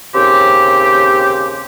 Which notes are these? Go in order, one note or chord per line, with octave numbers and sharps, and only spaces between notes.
D#2 C#3 C4 G4